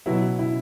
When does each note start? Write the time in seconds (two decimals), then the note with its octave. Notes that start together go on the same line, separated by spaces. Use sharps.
0.06 B2 F#3 B3 E4
0.39 E4